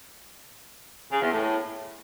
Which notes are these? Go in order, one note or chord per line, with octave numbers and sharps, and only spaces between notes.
C#3
E2
A2